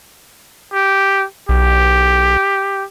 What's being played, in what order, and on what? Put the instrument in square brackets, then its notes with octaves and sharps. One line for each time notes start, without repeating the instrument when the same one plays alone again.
[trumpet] G4
[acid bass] B1 [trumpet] G4